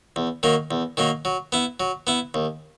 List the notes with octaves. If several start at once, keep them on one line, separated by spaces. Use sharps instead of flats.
E2
D#3 F#3 A#3
E2
D#3 F#3 A#3
F#3
B3 E4
F#3
B3 E4
D#2